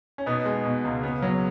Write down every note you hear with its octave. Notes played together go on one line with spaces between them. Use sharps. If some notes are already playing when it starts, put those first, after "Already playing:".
C#4
B2 B3 D#4
G#3
B2
C#2
C#3 B3
F#3